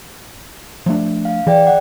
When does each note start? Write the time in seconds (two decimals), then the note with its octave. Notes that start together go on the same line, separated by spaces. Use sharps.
0.86 F3 A3 D4
1.25 F5
1.47 E3 G#4 D5 G5
1.67 F#5